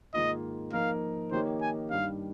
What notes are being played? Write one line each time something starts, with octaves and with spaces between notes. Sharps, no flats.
G#2 D#3 A#3 F4 D#5
F3 A#3 D#4 A#4 F5
D#3 A#3 D#4 G4 C5 C#5
G#5
G2 D#3 G3 F5